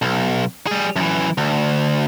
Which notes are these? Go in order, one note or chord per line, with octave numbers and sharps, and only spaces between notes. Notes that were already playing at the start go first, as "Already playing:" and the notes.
B1
G3 G#4
F#2 E3
D2